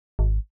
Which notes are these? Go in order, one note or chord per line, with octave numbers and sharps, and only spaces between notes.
G#1